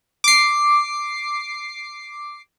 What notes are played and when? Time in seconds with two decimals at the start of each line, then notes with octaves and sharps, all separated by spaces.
0.24 D6 C7